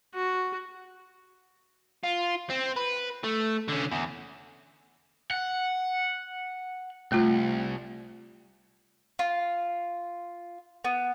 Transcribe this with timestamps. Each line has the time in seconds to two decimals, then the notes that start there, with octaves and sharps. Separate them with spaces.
0.14 F#4
2.03 F4
2.50 C4
2.77 B4
3.24 A3
3.69 D3 C#4
3.92 E2
5.31 F#5
7.12 C2 A3 F4
9.19 F4
10.84 B3